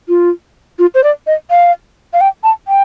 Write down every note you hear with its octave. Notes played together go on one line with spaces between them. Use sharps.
F4
F4
C5
D5
D#5
F5
F5
G5
A5
G5